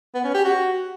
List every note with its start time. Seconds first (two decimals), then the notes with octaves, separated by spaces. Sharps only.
0.14 B3
0.24 C#4
0.34 G4
0.44 F#4